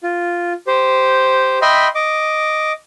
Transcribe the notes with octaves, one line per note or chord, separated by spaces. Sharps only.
F4
G4 C5
D#5 E5 G5 B5 C6
D#5 D6